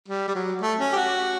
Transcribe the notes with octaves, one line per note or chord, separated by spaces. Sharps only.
G3
G3
F#3
A3
C#4
G4
F#4